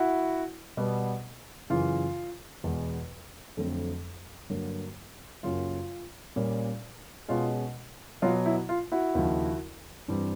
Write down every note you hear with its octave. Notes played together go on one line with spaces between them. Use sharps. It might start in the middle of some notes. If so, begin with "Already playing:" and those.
Already playing: E4 F#4
B2 G3 B3
F#2 C#3 E3 F4
E2 B2 G#3 B3
F2 D3 F#3 A3 C4
G2 D3 F#3 A#3
F#2 C#3 F#3 A#3 F4
A#2 G3 A#3 C#4
B2 G#3 C#4 F4
B2 F#3 B3 F4
E4
F4
E4 F#4
D#2 C#3 F3
G2 E3 G3 C4